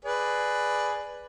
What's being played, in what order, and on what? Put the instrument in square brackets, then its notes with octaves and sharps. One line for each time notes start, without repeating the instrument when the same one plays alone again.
[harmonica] G#4 B4 D5